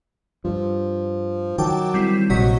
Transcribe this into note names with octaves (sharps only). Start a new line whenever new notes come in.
G2 F3
D#3 F#3 G5 A5 D6
G3 C4 E4
A#1 C3 F#3 D#5 C#6 B6